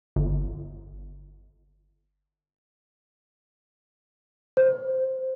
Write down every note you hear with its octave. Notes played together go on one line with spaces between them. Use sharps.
G1
C5